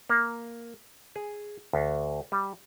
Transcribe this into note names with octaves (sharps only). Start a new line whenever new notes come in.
A#3
G#4
D2
G3